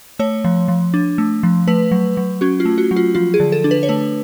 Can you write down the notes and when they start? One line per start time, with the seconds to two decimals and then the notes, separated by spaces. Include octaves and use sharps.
0.19 A3 C#5
0.44 F3
0.68 F3
0.94 D4
1.18 A3
1.43 F3
1.68 A3 B4
1.92 F#3
2.17 F#3
2.41 C#4 F#4
2.60 F4
2.65 A3
2.78 F#4
2.91 F#3
2.96 F4
3.15 F3 F4
3.34 G#4
3.40 D3
3.52 A4
3.64 D4
3.71 B4
3.83 C#5
3.89 A3 B4